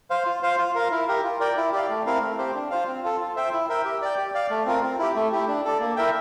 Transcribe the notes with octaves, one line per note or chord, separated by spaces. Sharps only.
C5 F5
F4
C5 F5
F4
A#4 F5
E4
G4 A#4
F4
A#4 D5 G5
E4
G4 D5 F5
A3
C4 E4 A#4 F5
A3
C4 G4 C5
D4
F4 C5 F5
C4
F4 A4
F4
C5 E5 G5
E4
A#4 E5 G5
G4
D5 G5
G4
D5 F5
A3
C4 F4 A#4
C4
E4 G4
A3
E4 G4
D4
A4 D5
A#3
E4 A#4 E5 G5